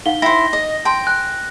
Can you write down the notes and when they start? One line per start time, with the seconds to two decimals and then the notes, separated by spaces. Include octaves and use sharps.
0.06 D#4 F5 F#5 G7
0.22 E4 C5 G5 A#6
0.53 D#5
0.85 G5 A5 C6
1.07 G#5 F#6